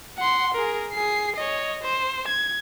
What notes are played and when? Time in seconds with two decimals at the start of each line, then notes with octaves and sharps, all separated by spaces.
0.18 F#5 C6
0.54 G#4 A#4
0.93 G#4 C7
1.36 C#5 D#5
1.82 C5
2.27 G#6